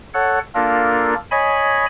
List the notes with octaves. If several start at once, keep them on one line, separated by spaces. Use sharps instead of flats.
A4 C#5 F#5
A#3 D4 F4 A4 A#4
C#5 D#5 G#5 B5